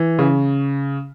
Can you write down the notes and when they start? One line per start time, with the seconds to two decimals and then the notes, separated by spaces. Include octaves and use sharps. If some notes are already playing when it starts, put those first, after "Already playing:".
Already playing: E3
0.19 C#3